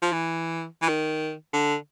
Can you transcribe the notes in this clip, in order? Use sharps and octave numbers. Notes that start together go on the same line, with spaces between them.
F3
E3
E3
D#3
D3